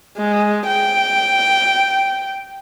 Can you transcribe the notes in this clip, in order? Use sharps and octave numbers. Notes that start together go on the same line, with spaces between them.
G#3
G5